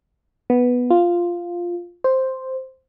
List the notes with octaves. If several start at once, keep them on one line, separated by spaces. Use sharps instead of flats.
B3
F4
C5